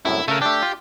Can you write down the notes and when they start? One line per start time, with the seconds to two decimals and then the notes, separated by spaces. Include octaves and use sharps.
0.05 C2 F#2 A2 E4
0.28 C#3 A3 A#4
0.42 A3 D4 G4
0.62 F4